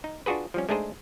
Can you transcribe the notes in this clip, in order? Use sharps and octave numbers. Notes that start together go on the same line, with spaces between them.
D#4
D4 F4 F#4 G#4 B4
F3 G3 C#4
G#3 A3 D4 D#4 G#4 C5